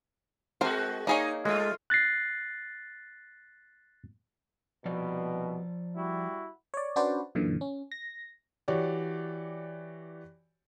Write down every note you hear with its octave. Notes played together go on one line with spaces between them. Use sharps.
G#3 C4 F#4 A#4 C5
A#3 D#4 G#4 C#5
G#3 A3 F4
F#6 A6 A#6 C7
C2 B2 F3 D5
G3 E4 F#4
C#5 D5
C#4 D4 F#4 B4 C5 D5
F#2 A#2 D3 E3
C#4
A#6
E3 F#4 G4 C#5 D5